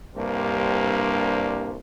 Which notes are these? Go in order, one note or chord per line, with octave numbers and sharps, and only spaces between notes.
C2 G2 A#3 D4 G4 C5